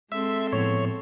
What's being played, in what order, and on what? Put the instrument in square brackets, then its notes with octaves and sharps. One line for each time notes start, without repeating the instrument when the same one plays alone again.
[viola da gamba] G#3 C4 A4 [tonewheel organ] E5
[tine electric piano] A2 F3 B3 [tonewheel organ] C#5